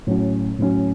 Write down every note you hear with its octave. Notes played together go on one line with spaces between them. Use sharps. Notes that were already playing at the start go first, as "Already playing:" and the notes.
A2 F#3 C#4
A2 F#3 C#4